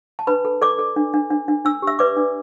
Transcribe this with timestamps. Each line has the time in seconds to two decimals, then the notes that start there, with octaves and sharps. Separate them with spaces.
0.19 A5
0.27 D4 B4 B5
0.45 A4
0.62 A4 D5 D6
0.79 A4
0.96 D4
1.14 D4
1.30 D4
1.48 D4
1.65 D4 E6
1.82 G4 E5 E6
1.99 B4 D5 D6
2.17 D4